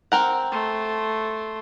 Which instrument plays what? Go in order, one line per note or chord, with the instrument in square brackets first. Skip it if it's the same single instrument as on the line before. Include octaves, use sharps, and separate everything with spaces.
[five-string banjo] C4 A#4 F#5
[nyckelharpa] A3 C6